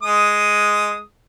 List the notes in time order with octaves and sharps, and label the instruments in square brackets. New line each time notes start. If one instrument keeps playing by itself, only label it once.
[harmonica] G#3 D#6